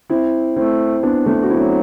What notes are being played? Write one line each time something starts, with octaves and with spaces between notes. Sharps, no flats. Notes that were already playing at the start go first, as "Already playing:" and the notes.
C4 E4
A3 C4 E4
B3 D4
A3 C4
F#4
F#3 C4 E4